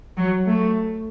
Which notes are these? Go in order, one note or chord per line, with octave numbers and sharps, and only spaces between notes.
F#3
A3